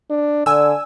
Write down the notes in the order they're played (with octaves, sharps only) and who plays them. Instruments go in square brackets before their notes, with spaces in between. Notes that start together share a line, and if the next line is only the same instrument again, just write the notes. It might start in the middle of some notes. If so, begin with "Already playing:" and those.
[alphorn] D4
[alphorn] D3 [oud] D4 [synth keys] G#5 E6